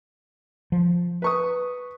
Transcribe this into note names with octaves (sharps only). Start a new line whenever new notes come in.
F3
B4 C#6 D#6